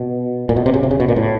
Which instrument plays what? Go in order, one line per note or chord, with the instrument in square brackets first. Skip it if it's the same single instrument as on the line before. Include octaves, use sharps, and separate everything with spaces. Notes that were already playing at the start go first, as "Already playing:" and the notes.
Already playing: [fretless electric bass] B2
A#2
B2
C3
C#3
C3
C#3
B2
A#2
A2